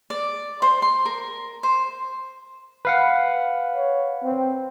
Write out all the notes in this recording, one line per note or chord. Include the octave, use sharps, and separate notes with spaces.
D5
C5
C6
A#4
C5
B4 F5 F#5
C#5
C4